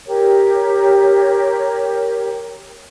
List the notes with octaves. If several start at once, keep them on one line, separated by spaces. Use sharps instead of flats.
G4 A#4 C#5